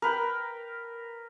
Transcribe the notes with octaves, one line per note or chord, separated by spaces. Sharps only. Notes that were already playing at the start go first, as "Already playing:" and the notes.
A#4 B4 G5